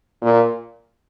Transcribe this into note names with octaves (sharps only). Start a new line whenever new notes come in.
A#2